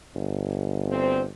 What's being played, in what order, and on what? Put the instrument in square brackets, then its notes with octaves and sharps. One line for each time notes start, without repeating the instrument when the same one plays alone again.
[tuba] G1
[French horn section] D2 C4